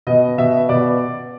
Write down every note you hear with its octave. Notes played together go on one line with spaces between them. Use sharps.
B2 D#5
B2 E5
B2 D5